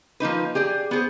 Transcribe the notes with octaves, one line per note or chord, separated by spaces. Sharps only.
F3 A#3 D#4 B4
G4 G#4 D5
B3 G#4 C5